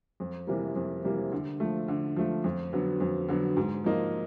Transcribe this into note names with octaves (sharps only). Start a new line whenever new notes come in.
F2
C3 E3 G3 A#3
F2
C3 E3 G3 A#3
D3
F3 A3
D3
F3 A3
F2
D3 F#3 B3
F2
D3 F#3 B3
G#2
F3 A#3 D#4